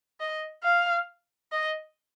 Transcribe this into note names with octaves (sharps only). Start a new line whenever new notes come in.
D#5
F5
D#5